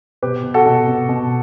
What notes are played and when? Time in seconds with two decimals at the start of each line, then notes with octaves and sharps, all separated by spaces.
0.22 B2 G4 B4
0.43 B2
0.54 F#4 A4
0.66 B2
0.87 B2
1.09 B2